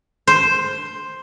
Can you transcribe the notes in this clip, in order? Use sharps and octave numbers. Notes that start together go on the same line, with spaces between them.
C5